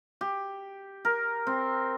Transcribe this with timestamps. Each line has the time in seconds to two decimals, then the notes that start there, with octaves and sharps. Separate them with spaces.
0.21 G4
1.05 A#4
1.47 C4